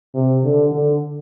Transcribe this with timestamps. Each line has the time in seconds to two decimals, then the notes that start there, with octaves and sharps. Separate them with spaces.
0.15 C3
0.43 D3
0.72 D3